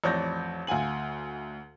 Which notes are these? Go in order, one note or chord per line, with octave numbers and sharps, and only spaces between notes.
A1 F2 C#5 D5 G6 A#6
D2 F5 F#5 G#5 F#7